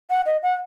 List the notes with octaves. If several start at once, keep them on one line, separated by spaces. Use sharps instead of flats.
F#5
D#5
F#5